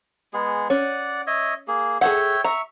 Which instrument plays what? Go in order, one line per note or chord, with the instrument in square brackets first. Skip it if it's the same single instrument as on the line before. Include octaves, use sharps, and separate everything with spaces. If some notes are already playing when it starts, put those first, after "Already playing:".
[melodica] G#3 B3 G#4
[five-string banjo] C#4 [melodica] D5 F#5
[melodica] C#5 D#5 E5
A#3 G#4
[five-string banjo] G#4 A4 F#5 [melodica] C#5 E5 G5
[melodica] E5 C#6 [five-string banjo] A#5